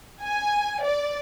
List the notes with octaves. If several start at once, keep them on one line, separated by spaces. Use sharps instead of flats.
G#5
D5